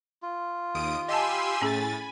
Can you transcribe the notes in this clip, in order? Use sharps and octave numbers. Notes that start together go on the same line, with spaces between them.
F4
D#2 D#6 D7
G4 D#5 G#5 A5 B5 C6 E6
A2 C#4 G#4 A6